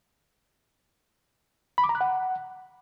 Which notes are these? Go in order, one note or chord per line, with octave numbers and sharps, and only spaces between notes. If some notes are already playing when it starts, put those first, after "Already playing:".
B5
D6
A#5
F#6
F#5